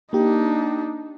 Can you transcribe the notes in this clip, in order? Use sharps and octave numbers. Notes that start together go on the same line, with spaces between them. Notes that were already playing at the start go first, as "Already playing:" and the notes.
A#3 D4 D#4 G4